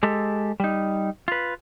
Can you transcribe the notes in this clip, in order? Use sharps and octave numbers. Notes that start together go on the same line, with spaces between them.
G#3 G4 A4
G3 D#4
F4 B4